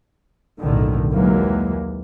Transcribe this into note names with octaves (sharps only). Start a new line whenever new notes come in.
F#1 B1 A2 D3 D#3
D#2 E3 F#3 G#3 A#3